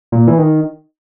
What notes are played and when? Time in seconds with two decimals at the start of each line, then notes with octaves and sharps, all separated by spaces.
0.12 A#2
0.28 E3
0.38 D#3